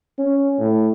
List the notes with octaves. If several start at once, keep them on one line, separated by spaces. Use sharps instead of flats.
C#4
A2